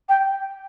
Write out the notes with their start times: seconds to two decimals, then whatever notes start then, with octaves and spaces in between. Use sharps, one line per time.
0.09 G5